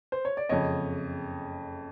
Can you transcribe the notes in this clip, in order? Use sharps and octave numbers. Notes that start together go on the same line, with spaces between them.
C5
C#5
D5
F#1 F2 C#3 C#5 D#5